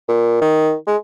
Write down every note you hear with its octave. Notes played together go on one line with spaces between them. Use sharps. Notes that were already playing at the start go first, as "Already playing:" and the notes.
A#2
D#3
G#3